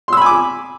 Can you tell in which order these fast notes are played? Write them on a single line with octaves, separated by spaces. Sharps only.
C6 E6 B5 G#5 D6